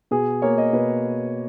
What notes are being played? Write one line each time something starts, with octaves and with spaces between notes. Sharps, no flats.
B2 G#4
A#3 C#5
D#5
B2 B4